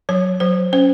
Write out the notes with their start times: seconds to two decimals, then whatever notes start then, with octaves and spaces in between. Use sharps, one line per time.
0.09 F#3 C#5
0.40 F#3 C5
0.73 C#4 C5